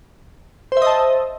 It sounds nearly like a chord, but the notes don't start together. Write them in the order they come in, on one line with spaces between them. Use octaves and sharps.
C5 E5 D#5 A5